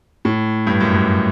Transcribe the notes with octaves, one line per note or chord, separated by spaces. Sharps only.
A2
G2
F#2
G2